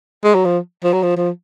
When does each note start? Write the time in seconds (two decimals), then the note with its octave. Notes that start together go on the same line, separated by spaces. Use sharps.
0.24 G#3
0.35 F#3
0.45 F3
0.84 F3
0.93 F#3
1.03 F3
1.17 F3